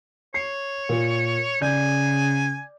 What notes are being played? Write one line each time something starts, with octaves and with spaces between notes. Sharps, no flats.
C#5 C7
A#2
C#3 D5 G#5 G6